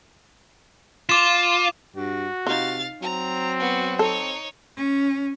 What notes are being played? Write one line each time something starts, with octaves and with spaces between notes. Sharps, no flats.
F4 D6 E7
G2 F#4
C3 D#4 F4 F5 A6
F#3 C4 A#5
B3 F#4
D#4 A4 C#5
C#4